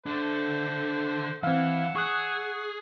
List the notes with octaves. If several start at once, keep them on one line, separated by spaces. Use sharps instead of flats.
D3 A3 D4 C5
E3 C4 F5 F#5 E6
G#4 C#6 D#6 F#6